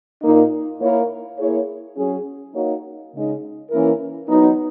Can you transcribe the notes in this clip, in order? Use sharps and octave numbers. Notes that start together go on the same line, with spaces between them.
A#2 A#3 D#4
A#3 E4 A#4 C#5
A#3 E4 G#4 C#5
F#3 C#4 G#4
A#3 D#4 F#4 C#5
C#3 G#3 D#4
E3 A#3 C#4 E4 A#4
F#3 B3 D#4